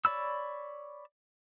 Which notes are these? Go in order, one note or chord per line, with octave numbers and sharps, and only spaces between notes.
C#5 D5 B5 E6